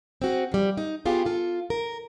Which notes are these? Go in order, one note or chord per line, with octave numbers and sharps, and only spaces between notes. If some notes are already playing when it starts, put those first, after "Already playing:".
C4 F#4 G#4
F3 G3
D#4
B3 F4 G4 G#4
F4 A4
A#4